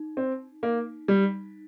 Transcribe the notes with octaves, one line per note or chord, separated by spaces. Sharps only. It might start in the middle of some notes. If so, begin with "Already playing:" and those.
Already playing: D#4
C4
A#3
G3